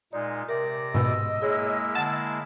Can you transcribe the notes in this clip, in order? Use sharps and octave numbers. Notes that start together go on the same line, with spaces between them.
A#2 G#3 D#4 D5
C3 A#4 D5 E5 A#6
G#2 B2 D#5 B5 E6
G#3 A#3 E4 G#4 C#5
D3 F#5 A5